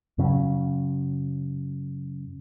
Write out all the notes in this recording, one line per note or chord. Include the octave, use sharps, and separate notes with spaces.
F#2 C#3 F#3 C#4